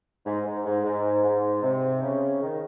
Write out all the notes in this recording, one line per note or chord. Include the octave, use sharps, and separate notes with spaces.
G#2
G#2
G#2
G#2
G#2
C3
C#3
D#3